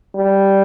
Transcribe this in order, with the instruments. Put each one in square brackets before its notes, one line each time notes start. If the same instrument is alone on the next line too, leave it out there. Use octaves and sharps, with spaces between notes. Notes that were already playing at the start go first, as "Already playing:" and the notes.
[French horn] G3